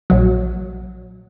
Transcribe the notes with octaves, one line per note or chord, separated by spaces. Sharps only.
A#1 F#3